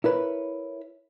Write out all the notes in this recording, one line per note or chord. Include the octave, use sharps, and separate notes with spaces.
E4 A#4 B4 C#5